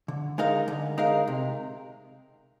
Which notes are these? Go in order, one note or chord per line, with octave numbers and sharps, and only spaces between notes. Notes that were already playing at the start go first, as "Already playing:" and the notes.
D3
G#3 D#4 A#4 F5
D3
G#3 D#4 A#4 F5
C3